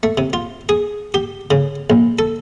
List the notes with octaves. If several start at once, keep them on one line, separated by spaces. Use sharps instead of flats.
A3
C3
F4
G#4
G4
C#3
A#1
A4